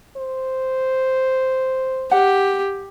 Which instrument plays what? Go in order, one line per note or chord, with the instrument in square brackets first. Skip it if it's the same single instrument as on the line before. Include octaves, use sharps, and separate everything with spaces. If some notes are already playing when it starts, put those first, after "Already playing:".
[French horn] C5
[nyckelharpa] G4 [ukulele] F#5